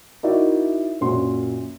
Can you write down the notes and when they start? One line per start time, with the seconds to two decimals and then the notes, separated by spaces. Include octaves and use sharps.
0.23 D#4 E4 F#4 A#4 D5 E5
1.01 F#2 A#2 F#4 C6